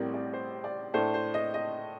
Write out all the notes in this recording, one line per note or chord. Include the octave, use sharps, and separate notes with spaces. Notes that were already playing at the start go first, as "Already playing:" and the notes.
Already playing: A1 A2 G3 C4 A#4 D5
D5
C5
D5
A2 A3 D4 C5
C5
D#5
D#5